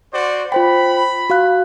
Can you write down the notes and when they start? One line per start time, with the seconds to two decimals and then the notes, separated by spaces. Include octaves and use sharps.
0.13 F#4 C5 D5
0.52 F4 C5 G5 B5
1.30 F#4 F5 F#6